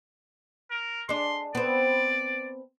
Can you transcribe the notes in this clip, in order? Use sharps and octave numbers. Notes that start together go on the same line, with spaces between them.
A#4
G#3 D4 C6
B3 C4 D5